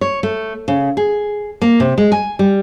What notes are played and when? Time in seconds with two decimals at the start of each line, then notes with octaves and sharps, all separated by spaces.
0.01 C#5
0.23 A3
0.68 C#3
0.97 G#4
1.62 A#3
1.80 C3
1.98 G#3
2.12 G#5
2.39 G3